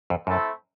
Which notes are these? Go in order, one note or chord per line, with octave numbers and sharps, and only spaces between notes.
F2
F#2 A3 C4 E4 A4